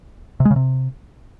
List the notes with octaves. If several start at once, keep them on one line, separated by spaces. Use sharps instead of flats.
C3
G#3
C#3
C3